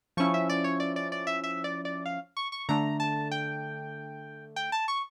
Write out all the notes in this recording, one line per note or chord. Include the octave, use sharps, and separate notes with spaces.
F3 C#4 E4 C#6
E5
D5
C#5
D5
D5
D5
E5
E5
D5
D5
F5
C#6
C#6
D3 A3 D4 A#5
A5
G5
G5
A5
C#6